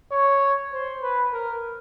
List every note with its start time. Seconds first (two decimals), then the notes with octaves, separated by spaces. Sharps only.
0.12 C#5
0.73 C5
1.02 B4
1.32 A#4